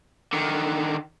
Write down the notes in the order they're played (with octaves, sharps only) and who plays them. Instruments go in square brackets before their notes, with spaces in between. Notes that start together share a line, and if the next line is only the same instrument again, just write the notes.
[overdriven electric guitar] D3 D#3